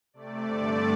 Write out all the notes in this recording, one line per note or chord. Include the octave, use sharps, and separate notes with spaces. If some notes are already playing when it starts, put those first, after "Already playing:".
C3 A3 D5
G2 D3 A3